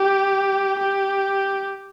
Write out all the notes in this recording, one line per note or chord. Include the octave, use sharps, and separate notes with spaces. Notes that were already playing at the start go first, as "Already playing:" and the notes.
Already playing: G4
G4